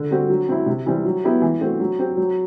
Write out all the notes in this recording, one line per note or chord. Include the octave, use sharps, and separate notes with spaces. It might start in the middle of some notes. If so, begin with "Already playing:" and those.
Already playing: D3
G3 C4 F#4
F#3
C4 E4
C3
E3 G3 C4
F#3
B3 E4 G4
E3
A3 C4 F#4
F#3
C4 G4
F#3